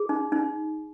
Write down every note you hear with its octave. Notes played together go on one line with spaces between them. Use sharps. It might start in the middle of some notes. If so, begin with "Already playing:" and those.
Already playing: G#4
D#4
D#4